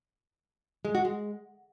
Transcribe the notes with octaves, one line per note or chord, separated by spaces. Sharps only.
G#3
F#4
G#3